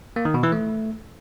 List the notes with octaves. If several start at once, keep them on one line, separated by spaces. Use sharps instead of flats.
A#3
D#3
B2
E3
A3